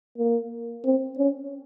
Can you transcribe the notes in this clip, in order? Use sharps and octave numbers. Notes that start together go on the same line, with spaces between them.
A#3
C4
C#4